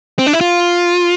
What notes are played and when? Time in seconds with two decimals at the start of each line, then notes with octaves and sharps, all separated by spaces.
0.19 C4
0.26 D4
0.33 E4
0.41 F4